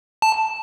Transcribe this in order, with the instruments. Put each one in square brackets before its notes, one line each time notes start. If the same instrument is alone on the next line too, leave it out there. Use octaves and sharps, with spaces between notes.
[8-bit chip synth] A5